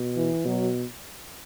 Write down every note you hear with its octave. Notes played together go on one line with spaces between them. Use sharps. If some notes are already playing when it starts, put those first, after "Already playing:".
Already playing: B2
E3
B2 F#3